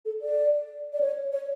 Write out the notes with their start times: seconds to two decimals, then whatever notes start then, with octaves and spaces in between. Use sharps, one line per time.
0.05 A4
0.22 D5
0.93 D5
1.01 C#5
1.32 C#5